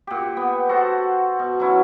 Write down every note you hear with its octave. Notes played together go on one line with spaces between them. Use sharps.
A#2 G4
B3
F#4 A4 C5
B2
F#3 C#4 E4